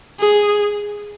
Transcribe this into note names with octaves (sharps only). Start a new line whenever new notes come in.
G#4